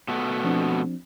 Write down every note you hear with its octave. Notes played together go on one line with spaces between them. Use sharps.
B2 A3 B3
F3 C4 D4